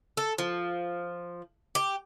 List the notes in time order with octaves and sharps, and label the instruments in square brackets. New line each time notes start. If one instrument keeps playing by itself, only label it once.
[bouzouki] A4
F3
G4